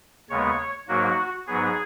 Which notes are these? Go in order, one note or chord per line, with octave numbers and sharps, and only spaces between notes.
D#2 C#3 G#3 B3 C#5
G#2 F#3 A#3 F#4
G#2 F#3 B3 G#4